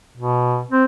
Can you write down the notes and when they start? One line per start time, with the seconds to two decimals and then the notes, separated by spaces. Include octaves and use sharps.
0.17 B2
0.71 C4